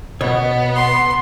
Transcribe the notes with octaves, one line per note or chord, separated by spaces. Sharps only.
B2 B3 C#5
C6